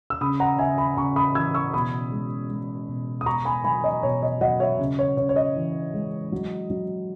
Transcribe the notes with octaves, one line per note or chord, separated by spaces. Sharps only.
E6
C#3 B5 D#6
F#5 A#5
C#3 E5 G#5
G#5 B5
C#3 A#5 C#6
B5 D#6
E3 E6 G#6
C#6 E6
B2 B5 D#6
G#3
G#3
B2
D#6
B2 A#5 C#6
G#5 B5
F#3 G#5 B5
D#5
B2 C#5
D#5
F#3 D#5 F#5
C#5 E5
C#3
C#5
C#3 C#5
C#5
D#5
E3
G#3
F#3
F#3